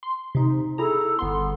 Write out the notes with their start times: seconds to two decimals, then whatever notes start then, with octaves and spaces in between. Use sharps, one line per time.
0.03 C6
0.35 C3 D#4
0.78 E4 G#4 A4 A#5
1.19 G1 B3 C6